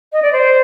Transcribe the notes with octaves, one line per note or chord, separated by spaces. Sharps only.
D#5
D5
C5